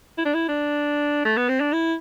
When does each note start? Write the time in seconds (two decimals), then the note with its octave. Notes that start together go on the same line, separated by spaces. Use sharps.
0.18 E4
0.25 D4
0.34 E4
0.49 D4
1.25 A3
1.37 B3
1.49 C4
1.60 D4
1.73 E4